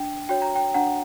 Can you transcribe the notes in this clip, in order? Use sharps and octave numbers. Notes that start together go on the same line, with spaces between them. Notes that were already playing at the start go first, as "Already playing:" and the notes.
Already playing: D4 G5
F#4 C#5 G5
A#5
G5
D4 F#5 A#5